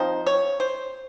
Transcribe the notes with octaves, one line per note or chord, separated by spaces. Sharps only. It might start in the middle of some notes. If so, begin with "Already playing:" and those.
Already playing: F3 C4 D#4 C5
C#5
C5